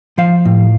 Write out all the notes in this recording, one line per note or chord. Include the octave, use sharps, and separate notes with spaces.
F3 F5
A2